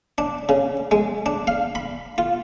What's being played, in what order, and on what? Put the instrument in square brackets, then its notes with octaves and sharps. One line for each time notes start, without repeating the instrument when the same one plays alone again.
[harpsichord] D4
C#3
G#3
D4
F5
B5
F4